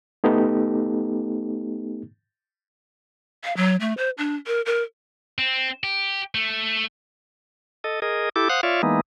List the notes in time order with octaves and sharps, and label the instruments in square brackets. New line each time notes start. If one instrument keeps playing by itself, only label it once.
[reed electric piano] A3 B3 D#4 G4 A4
[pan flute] F5
F#3
A3
C5
D4
A#4
A#4
[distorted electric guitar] C4
G4
A3
[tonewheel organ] A4 D#5
G#4 A#4 D#5
E4 G4 A4 D6
C5 F5 F#5 D#6 F#6
F4 C#5 D5 E5 F5
E3 G#3 A#3 B3 D#4